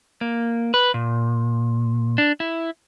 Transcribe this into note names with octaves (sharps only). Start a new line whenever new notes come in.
A#3
B4
A#2
D4
E4